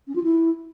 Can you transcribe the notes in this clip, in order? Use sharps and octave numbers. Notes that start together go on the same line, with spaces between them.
C#4
F4
E4